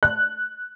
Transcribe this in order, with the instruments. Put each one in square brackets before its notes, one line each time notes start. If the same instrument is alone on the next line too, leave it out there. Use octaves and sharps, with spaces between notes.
[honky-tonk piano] F#6